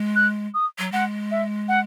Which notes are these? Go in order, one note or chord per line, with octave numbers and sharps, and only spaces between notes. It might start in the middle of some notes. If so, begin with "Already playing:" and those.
Already playing: G#3
F#6
D#6
F#3
G#3 F#5
E5
F#5